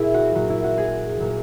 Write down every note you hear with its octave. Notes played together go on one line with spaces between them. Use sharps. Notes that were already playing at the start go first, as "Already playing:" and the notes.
Already playing: A#2 F#3 E4 G#4
F#4
A#2 F#3 F#4
E4
F#4
G#4
A#2 F#3